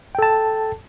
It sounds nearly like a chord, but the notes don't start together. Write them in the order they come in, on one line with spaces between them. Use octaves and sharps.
G5 A4 A5